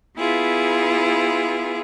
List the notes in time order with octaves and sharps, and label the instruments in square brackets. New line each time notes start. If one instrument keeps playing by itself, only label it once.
[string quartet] B3 E4 F4 G#4